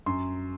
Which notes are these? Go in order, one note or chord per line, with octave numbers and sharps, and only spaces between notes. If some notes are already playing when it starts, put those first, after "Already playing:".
F#2 C6